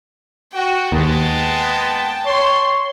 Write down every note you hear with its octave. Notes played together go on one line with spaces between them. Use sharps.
F#4 G5
D#2 G#3 B3 G5 A5
C#5 C6